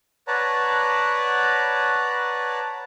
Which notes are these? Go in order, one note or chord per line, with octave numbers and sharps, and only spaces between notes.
B4 C#5 D5 F#5 A5 A#5